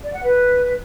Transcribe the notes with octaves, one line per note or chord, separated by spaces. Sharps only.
D5
F#5
B4